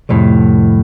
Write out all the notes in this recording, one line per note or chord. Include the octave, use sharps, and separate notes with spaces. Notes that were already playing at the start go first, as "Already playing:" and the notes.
C2 F2 A2